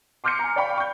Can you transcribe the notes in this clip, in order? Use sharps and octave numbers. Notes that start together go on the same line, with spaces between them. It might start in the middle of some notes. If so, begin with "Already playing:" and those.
C6 D6 F6 G6 C7 C#7
G#5 A#5
D5 F5 G5 B5 C#6
C#6 G6